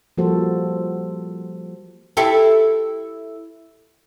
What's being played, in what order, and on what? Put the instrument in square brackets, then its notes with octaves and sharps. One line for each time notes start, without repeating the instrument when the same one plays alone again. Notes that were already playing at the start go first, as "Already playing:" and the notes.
[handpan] F3 G3 A#3 F#4 A4 C5
[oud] E4 G4 A4